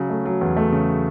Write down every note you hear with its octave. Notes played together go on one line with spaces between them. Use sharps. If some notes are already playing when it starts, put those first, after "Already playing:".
Already playing: C#3 F#3
A3
F#3
E2
A3
C#3